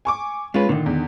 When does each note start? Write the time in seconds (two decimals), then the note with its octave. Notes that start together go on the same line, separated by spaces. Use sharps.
0.05 G#5 C#6 D6
0.54 G#3 C#4 F4 B4
0.69 A#2 D3 D#3
0.86 E2